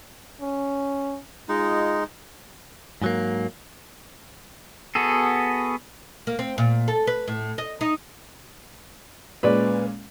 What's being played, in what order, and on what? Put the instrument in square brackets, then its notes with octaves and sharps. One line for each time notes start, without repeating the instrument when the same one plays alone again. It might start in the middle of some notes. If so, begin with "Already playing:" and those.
[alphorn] C#4
[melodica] G#3 D#4 [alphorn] F4
[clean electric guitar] G#2 F#3 A#3
[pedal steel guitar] B3 F#4 G#4 A4
[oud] A#3
C4
A#2
A4
B4
A2
D#5
D#4
[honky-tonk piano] A#2 G#3 C#4 [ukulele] B4 D5